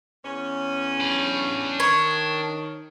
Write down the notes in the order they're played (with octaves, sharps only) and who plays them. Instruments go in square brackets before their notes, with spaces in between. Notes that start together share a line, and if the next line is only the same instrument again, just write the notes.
[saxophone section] E2 C#4
[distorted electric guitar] D4 B5
[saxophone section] D#3 [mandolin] C#5